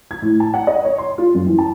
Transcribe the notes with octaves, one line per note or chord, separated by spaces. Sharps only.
G#6
A2
A5
F#5
D#5
C#5
C6
F4
F#2
E3
A5